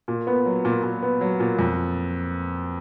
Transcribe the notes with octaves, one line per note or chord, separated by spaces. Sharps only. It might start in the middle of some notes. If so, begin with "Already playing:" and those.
A#2
B3
F#3
A#2
A#2
B3
F#3
A#2
F2